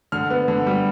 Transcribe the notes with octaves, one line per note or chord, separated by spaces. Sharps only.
D3 F6
B3
D3
G3